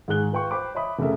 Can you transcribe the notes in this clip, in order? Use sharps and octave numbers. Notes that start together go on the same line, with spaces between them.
G#2 D#3 G#4 F#6 G7
F4 B4 G5 C#6
C5 G5 B5 D6
C#5 D#5 E5 B5 D#6
F1 C#3 A4 A#4 E5